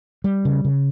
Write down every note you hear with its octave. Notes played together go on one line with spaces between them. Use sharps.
G3
C#3
C#3